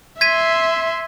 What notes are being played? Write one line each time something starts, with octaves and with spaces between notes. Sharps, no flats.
E5 C6 G#6 B6 D#7